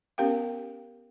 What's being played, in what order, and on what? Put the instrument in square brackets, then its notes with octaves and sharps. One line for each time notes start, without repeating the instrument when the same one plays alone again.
[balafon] B3 C#4 G4 A#4 F5 G5